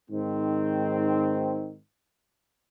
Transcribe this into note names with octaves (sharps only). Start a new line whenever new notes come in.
G#2 D#3 C4